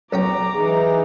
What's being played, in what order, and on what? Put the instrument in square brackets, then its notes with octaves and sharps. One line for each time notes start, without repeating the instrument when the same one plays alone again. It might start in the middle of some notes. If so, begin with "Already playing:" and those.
[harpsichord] B1 C#4 G5 [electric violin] A#5 D6
[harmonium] E3 D#4 [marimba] G#4